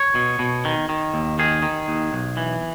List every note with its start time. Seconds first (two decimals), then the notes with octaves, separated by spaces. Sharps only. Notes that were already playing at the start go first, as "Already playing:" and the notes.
Already playing: C#5
0.15 B2
0.39 B2
0.65 D#3
0.89 D#3
1.14 D#2
1.39 D#3 G#4
1.63 D#3
1.88 D#2
2.13 B1
2.37 E3